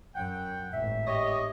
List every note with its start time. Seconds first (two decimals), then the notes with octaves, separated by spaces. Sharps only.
0.15 F#2 F#5 G5
0.73 G#1 A2 E5
1.07 G4 C#5 D#5